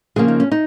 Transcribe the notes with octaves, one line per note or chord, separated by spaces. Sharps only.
C#3 F3 G#3 A#3 G#4
D#4
C#4
D#4